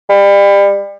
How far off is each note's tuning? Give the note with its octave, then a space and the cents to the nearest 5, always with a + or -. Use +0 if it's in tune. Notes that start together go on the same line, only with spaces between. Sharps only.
G3 +30